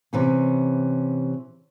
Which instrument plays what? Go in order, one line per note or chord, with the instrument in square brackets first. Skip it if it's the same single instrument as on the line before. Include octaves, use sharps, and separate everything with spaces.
[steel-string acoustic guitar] C3 E3 C#4